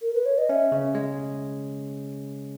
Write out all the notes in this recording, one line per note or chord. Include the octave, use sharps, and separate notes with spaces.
A#4
B4
C#5
D#5
C#4 E5
C#3
G#3